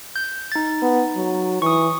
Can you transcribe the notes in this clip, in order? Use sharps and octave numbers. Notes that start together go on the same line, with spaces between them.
G6
D#4 A6
B3
F#3
E3 C#6 D#6